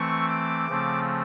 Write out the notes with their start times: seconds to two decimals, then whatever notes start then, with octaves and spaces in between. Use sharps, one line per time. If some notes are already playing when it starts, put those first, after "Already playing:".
Already playing: E3 A3 C4 C#6
0.29 D6
0.69 C#3 F3 A3 C4